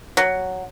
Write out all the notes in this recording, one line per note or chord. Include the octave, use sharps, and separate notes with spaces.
F#3